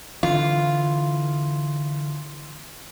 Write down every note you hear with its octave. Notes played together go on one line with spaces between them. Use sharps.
D3 E3 F4